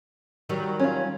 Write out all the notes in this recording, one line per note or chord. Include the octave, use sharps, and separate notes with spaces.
D#3 F#3 G3
C#4 F4